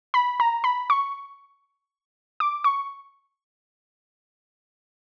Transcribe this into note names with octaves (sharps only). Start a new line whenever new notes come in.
B5
A#5
B5
C#6
D6
C#6